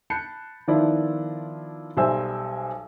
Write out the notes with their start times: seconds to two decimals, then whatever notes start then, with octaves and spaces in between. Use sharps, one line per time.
0.10 A5 B5 F#6 G6 C7 C#7
0.68 D#3 F3 B3 D4 E4 F4
1.97 B1 G3 C5 E5 G#5 E6